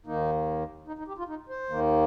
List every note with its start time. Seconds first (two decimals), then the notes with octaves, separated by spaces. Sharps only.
0.06 D#2 D#3 A#3 D#4
0.87 D#4
0.98 D#4
1.08 G4
1.19 F4
1.29 D#4
1.49 C5
1.69 D#2 D#3 A#3